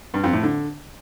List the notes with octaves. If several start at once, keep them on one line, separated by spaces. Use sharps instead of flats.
G2
F2
A2
D3